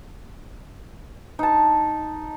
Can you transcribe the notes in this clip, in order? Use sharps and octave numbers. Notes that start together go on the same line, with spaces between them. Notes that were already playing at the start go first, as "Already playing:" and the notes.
D#4 A5